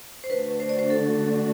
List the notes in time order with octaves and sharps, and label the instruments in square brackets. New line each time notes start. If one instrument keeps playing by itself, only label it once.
[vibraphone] C5
[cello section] D3 A3 D4 F#4 [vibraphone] B4
[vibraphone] C5
D5
C5
A4